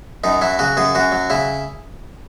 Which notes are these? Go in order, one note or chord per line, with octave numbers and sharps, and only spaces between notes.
F#2 D#4
F#3 E4
C#3 F#4
F#2 G#4
F#2 F#4
F#3
C#3 E4